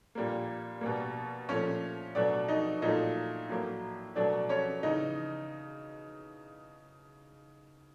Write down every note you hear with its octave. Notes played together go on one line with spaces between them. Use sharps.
A#2 G3 A#3
B2 G3 A#3
A#2 F3 A3 C#4 C#5
B2 F#3 A3 D4 D5
D#4 D#5
A#2 F#3 A3 D#4 D#5
A2 F#3 A#3
B2 F#3 A3 D4 D5
C#4 C#5
C#3 E3 D#4 D#5